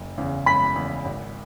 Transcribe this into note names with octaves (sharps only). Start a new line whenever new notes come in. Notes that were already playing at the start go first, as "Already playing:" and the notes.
Already playing: F#1
E2 C#3
F#1 B5 B6
E2 C#3
G#1